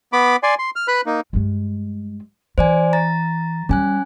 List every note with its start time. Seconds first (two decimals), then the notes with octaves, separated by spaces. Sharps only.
0.13 B3 B5 D6
0.43 D5 G#5 C6
0.59 C6
0.76 F6
0.88 B4 B5 F#6
1.06 A#3 D#4
1.33 G2 G#3
2.58 E3 C5 D5 G#5
2.93 A#5 A6
3.69 G3 C#4 G#5 F#6